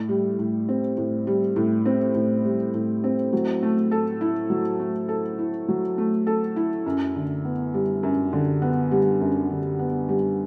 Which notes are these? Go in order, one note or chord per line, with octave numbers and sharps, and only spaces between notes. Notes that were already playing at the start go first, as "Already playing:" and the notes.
Already playing: A2
G3
A2
C4
A2
G3
A2
C4
A2
G3
A2
C4
F#3
A3
A4
E4
F#3
A3
A4
E4
F#3
A3
A4
E4
F#2
D3
B3
G3
F#2
D3
B3
G3
F#2
D3
B3
G3